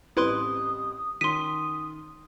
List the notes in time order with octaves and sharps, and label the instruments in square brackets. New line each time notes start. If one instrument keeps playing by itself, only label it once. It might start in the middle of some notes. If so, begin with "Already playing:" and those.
[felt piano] A1 G3 C4 [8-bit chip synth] E4 B4 C6 [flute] D#6
[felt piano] D#3 C#4 [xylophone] C6 D#7 [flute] D#6 [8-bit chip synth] B6